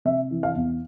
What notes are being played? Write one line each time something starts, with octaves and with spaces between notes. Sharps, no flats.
C3 E5
E3
F5
E2